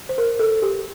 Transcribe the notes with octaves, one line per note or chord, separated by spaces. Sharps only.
C5
A#4
A4
G4